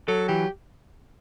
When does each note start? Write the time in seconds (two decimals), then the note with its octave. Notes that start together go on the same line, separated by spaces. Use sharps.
0.08 F#3 A4
0.28 E3 G4